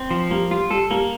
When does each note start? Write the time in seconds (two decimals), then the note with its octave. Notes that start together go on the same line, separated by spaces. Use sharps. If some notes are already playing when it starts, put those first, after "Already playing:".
Already playing: C4
0.11 F3
0.30 G3 A#3
0.50 G3 F4
0.70 G3 A4
0.91 G3 A#3